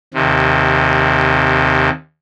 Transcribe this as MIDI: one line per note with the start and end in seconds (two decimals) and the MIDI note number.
0.14 1.90 39
0.14 1.90 48